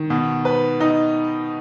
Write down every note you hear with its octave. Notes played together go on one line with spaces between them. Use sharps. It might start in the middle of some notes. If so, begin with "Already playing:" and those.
Already playing: D#3
B2
B4
D#4